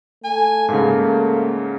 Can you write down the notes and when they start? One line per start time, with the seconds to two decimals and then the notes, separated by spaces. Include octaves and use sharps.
0.24 A3 G#5
0.69 G#2 C#3 A#3